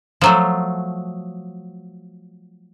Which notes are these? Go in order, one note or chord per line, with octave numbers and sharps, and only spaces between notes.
F3 F#3 A3